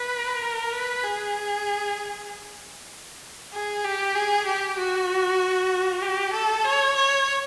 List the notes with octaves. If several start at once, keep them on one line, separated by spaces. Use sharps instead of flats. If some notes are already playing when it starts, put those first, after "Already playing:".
Already playing: B4
A#4
B4
G#4
G#4
G4
G#4
G4
F#4
G4
A4
C#5
C#5